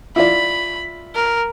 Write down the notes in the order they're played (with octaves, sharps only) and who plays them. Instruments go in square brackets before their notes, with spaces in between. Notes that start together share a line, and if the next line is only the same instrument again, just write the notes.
[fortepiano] E4 F4 D5 [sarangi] B5
[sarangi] A#4